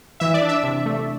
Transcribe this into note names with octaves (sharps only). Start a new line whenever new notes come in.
E3 E5
D5
D4
E5
C3
A3